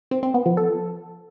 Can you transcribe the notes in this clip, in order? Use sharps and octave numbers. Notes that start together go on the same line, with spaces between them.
C4
C4
B3
F3
A4